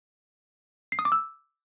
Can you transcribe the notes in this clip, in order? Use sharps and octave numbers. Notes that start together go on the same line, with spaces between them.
C7
D#6
D6
E6